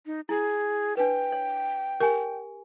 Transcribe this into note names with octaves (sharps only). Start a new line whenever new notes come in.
D#4
E4 G#4
D4 B4 G5
C#5
G4 A#4 G#5